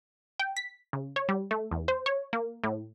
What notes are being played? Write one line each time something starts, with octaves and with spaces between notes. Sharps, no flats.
G5
B6
C#3
C#5
G3
A3
E2
C5
C#5
A#3
A2